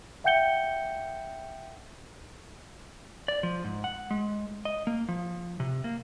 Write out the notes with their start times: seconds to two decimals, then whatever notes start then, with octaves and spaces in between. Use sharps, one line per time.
0.24 E5 F#5 G5 G6 C#7 G7
3.28 D5
3.43 F3
3.64 G#2
3.84 F#5
4.11 G#3
4.65 D#5
4.87 A#3
5.08 F3
5.60 C3
5.84 A#3